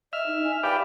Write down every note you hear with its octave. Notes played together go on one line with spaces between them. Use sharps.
D#5 E5 F6
D#4
G#5
G4 B4 D5 F5